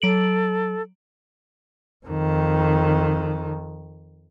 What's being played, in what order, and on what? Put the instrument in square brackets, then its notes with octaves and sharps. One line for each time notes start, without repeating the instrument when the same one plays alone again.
[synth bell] F#3 D7 F#7 [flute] A4
[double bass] F2 D#3